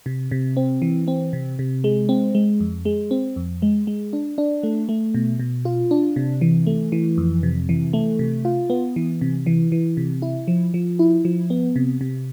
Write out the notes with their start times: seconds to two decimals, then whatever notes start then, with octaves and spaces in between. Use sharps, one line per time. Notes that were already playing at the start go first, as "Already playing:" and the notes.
0.06 C3
0.31 C3
0.57 C4
0.82 E3
1.08 C4
1.33 C3
1.59 C3
1.84 G#3
2.09 C4
2.35 G#3
2.60 F2
2.85 G#3
3.11 C4
3.36 F2
3.62 G#3
3.87 G#3
4.13 D4
4.38 D4
4.63 A3
4.89 A3
5.14 B2
5.39 B2
5.65 F4
5.91 D4
6.16 C3
6.41 E3
6.67 A3
6.92 E3
7.18 F2
7.43 C3
7.69 E3
7.93 A3
8.19 C3
8.45 F4
8.70 B3
8.96 E3
9.21 C3
9.46 E3
9.72 E3
9.97 C3
10.22 E4
10.48 F3
10.74 F3
10.99 E4
11.25 F3
11.50 B3
11.76 C3
12.01 C3